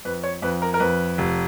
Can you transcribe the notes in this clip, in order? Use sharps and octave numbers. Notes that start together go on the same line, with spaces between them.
F2 B4
C#5
F2 B4
A#4
A#4
F2 B4
F1